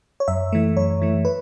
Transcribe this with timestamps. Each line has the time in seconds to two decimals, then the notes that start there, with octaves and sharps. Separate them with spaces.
0.20 C#5
0.28 F#2 E5
0.52 E3 A3
0.77 F#2 C#5
1.02 E3 A3
1.25 B4